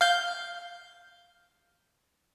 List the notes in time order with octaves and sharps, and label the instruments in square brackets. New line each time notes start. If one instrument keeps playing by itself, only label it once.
[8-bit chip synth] F5 G6